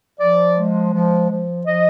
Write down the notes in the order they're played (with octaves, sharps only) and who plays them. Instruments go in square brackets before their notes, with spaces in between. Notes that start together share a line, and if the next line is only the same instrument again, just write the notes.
[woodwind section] F3 D5
G#3
F3
F3
F3 D#5